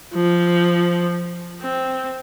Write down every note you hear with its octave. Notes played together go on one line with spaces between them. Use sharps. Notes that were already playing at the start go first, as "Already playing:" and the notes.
F3
C4